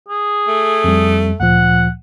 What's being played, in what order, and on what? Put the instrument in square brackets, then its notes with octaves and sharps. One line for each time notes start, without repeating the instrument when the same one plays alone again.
[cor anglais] G#4
[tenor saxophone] A3
[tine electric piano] F2 G3
[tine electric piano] D2 A#2 F3 [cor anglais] F#5